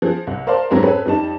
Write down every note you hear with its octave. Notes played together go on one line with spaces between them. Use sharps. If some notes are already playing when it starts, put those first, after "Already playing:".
F3 G#4
C2
A#4 C5 D5 F5 A5 C6
F2 G#2 C#3 F#3 C4 A#5
C4 C#4 G#4 A4 B4
F2 G3 D#4 A5